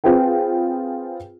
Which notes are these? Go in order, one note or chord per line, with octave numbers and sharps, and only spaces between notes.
C4 F4 G#4 B4 G5